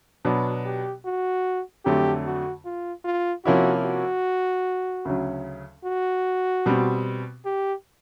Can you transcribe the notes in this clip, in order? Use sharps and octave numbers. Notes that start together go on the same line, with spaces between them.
B2 F#3 B3 D4 F#4
G4
F#4
F2 D3 F#3 A3 G4
F#4
F4
F4
C3 F3 A#3 C#4 E4 F#4
F#4
D2 C#3 F#3
F#4
B2 G3 C4
G4